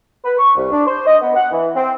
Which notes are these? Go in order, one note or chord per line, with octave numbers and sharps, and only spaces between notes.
B4
C#6
C2
D4
C5
D#5
B3
F#5
E3
C4